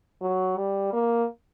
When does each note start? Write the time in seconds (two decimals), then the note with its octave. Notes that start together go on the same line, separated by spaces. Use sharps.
0.21 F#3
0.57 G3
0.93 A#3